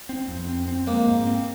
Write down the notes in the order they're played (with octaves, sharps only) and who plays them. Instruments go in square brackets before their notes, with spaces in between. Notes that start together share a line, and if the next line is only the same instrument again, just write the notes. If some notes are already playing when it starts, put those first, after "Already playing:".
[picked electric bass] C4
F2
C4
C4
[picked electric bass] G#3 [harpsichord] A#3
[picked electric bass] G#2
C4